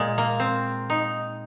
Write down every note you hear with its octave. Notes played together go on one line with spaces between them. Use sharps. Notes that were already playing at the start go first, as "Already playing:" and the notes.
Already playing: A#2 G#3
A#3
C4
D#4